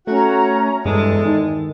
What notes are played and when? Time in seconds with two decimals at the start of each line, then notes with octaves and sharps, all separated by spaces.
0.07 A3 C#4 F#4 A#5
0.85 E2 G2 G#3 A4
1.25 D#3